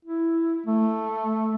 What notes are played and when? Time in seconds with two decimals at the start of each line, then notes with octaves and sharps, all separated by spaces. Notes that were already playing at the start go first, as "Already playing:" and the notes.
0.05 E4
0.66 A3